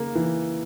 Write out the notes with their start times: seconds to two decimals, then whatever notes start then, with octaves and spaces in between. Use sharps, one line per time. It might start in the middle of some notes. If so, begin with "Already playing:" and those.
Already playing: C#3 A#3
0.15 E3